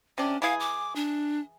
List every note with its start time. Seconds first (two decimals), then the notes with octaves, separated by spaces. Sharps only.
0.18 C3 C#4 D4
0.42 E3 E4 G#4 F5
0.60 D6
0.96 D4